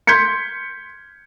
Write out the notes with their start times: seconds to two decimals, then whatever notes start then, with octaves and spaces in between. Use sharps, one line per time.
0.07 C6 G6 G#6 B6 C#7